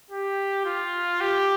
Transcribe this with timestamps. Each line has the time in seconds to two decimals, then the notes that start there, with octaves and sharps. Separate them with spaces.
0.11 G4
0.66 F4
1.21 G4